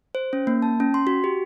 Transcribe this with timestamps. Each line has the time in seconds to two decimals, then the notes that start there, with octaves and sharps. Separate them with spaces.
0.15 C5
0.33 C#4
0.47 A#3
0.62 A5
0.80 C#4
0.94 C6
1.07 F#4
1.24 G4